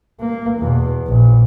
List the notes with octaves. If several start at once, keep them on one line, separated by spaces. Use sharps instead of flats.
A#3
E2 B2
A#1